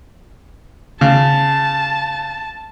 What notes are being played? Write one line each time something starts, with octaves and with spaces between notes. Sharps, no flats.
C#3 A5